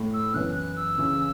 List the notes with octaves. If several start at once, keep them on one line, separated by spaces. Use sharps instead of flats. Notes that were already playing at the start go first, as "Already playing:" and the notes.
Already playing: A2 A3
E6
F#2 E3 B3 F#6
F#6
E6
C#3 E3 C#4